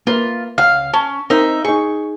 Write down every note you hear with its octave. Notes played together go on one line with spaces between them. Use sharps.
A#3 F4 B4 E5
C#2 F5 F#5
C#4 A5
C4 D#4 A#4 D#5 E5
D#4 G#4 C#6